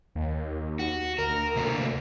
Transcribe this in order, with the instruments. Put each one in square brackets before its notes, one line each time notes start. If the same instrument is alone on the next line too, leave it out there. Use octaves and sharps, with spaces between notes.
[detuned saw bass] D#2
[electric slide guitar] F#4
[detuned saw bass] D2 [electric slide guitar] A#4
[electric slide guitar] C3 A#3 A4